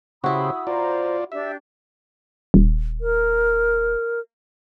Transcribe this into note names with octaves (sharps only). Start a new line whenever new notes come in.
C#3 E4 F#4 G4 C5 B5 D#6 E6
F4 C5 D5 A#5
D4 G4 E5
D#1
A#4